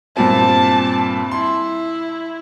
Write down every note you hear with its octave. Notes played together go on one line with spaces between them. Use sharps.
G2 A#2 C4 A5
E4 C6